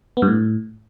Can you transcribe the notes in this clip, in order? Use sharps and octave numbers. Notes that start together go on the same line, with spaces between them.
B3
G2
A2